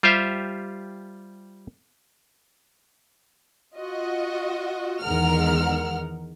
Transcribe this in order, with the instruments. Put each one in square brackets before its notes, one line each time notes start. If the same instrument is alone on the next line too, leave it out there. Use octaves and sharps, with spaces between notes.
[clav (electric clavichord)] G3 F4 G4 C5 E5 F5
[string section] F4 F#4 D#5
E2 D#3 G#3 A#4 F#5 F6